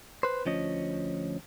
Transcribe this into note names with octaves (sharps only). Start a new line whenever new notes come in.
B4 C5
D2 F3 C#4 D#5